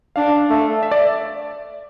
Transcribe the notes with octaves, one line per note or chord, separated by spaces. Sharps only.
D4 F5
A3
E5
D5